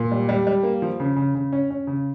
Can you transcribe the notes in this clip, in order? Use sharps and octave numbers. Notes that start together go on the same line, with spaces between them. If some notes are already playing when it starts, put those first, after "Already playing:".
Already playing: A#2
G3
G3
G3
A#3
F3
C#3
C#3
C#3
C#4
C#4
C#3